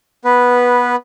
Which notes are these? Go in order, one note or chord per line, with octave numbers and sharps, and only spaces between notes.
B3 B4